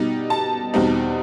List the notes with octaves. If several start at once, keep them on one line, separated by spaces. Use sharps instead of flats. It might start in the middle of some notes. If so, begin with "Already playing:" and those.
Already playing: B2 G3 D#4
A5
E2 B2 G3 C4 D#4